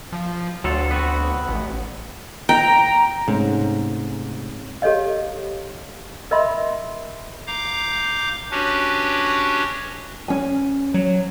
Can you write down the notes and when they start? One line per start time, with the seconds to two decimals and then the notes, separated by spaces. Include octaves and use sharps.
0.12 F3
0.64 D2 F#3 F4 A4
0.91 B3 C4 F#4
1.48 A1
2.49 G5 A#5
3.28 G#2 C3 A3 C#4
4.82 G4 A4 C#5 D#5 F5
6.31 A#4 D#5 E5 B5 C6
7.47 F5 A#5 D6 G6
8.51 C#4 D4 F#4 G4 B4 C#5
10.28 C#4 G#5
10.94 F#3